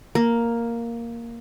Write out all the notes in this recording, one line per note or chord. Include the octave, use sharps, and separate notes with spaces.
A#3